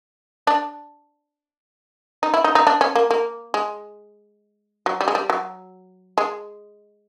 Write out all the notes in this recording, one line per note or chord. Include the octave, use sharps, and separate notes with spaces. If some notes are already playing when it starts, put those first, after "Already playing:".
D4
D#4
E4
D#4
D#4
D4
C#4
A#3
A#3
G#3
F#3
G3
G#3
G3
F#3
G#3